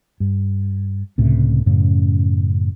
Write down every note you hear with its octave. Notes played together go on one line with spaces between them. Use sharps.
G2
C#2 A2 C3
F#2 A2 C#3